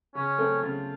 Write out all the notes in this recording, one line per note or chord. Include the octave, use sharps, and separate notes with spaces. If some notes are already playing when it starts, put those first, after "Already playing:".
C#3 C#4
A3 C4
C#3 F4